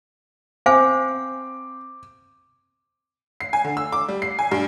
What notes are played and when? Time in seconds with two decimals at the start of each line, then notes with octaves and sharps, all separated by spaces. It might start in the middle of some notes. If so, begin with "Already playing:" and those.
0.66 C4 C5 F5 G#5 D6
3.41 C7
3.53 G#5
3.65 D3
3.77 E6
3.92 D6
4.08 G3
4.22 C7
4.39 G#5
4.51 G2